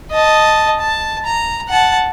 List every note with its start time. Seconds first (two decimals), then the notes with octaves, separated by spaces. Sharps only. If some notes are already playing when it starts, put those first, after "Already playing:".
0.12 D#5 A5
0.80 A5
1.25 A#5
1.68 F#5 A5